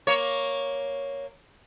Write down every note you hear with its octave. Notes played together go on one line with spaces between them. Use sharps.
A#3 C#5